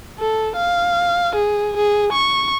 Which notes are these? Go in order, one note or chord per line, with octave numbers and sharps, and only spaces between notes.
A4
F5
G#4
G#4
C#6